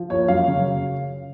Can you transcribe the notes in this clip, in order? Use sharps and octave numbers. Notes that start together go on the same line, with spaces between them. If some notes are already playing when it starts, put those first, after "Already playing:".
Already playing: F3
A#3 C#5
F#2 F5
C#3